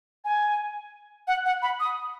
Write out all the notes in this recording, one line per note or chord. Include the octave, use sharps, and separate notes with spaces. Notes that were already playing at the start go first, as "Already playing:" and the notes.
G#5
F#5
F#5
B5
D#6